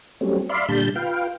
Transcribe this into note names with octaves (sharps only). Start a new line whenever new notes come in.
F#3 G3 A3 C4 C#4
D5 E5 F5 B5 C6
A#2 D3 G3 A5 B5 G6
F4 B4 F5 G5